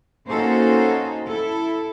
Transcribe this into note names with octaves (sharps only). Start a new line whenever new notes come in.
A#3 C#4 D#4 F#4 A4 C5
E4 A4